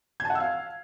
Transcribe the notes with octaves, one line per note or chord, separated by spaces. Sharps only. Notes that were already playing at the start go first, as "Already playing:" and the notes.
G#6
A5
F#5
E6
F5